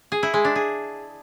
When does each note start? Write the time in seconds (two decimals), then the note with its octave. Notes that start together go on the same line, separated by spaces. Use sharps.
0.12 G#4
0.23 E4
0.34 G#3
0.45 D4
0.56 G#4